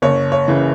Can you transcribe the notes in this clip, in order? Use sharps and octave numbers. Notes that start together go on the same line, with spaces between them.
F#1 C#5
C#5
C#3 E3